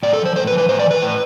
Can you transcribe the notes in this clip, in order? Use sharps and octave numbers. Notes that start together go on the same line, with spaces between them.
A2 D5
A4
F3
C5
A2 C5
B4
F3
B4
A2 C5
D5
E3 B4
A2